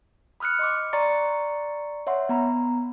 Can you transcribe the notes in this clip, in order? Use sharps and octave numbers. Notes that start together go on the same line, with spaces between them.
B5 D#6 F6 F#6 C#7
D#5 C6 D6
D5 A#5 C6 C#6 A6 C#7
C#5 E5 F#5 C6
B3 A#5 B5